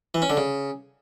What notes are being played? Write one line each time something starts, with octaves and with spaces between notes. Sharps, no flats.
E3
C#4
D3
C#3